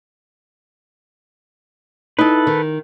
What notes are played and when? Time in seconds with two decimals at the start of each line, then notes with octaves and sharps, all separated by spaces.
2.19 D#4 E4 A4 B4
2.47 D#3